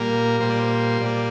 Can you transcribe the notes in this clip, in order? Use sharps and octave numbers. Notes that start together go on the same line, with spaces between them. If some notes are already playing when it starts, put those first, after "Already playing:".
Already playing: A#2 G3 A#3 A#4
A#2 G3 A#3 C5
D5
C5
A#2 G3 A#3 D5